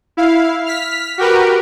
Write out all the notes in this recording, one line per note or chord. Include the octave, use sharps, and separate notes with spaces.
E4 F5
F6 B6
F#4 G4 A#4 B4